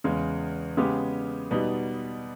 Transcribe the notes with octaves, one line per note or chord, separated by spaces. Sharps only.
E2 C#3 G#3
C#3 G#3 B3 G4
B2 G3 B3 D#4